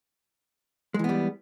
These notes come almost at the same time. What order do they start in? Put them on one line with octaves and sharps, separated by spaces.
G#3 E3 B3 G3